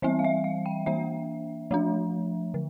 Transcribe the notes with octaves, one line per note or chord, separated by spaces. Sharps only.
E3 G3 C4 E5
F5
E5
F5
G5
E3 A#3 D4 E5
F3 A3 D4
D3